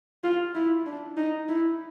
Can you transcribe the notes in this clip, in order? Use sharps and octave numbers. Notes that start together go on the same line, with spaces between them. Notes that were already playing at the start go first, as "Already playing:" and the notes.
F4
E4
D4
D#4
E4